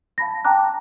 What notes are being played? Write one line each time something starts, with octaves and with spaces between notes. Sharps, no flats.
F5 A5 B5 A#6
G5 A5 A#5 D6 F#6